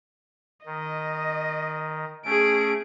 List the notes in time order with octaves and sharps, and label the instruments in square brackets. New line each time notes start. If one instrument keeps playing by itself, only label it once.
[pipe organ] D#3 [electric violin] D#5
[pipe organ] A3 C#4 [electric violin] G#4 D7